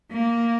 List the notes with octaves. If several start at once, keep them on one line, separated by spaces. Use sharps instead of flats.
A#3